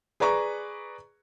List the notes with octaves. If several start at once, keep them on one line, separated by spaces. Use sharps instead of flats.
G#4 B4 D5 A#5 C#6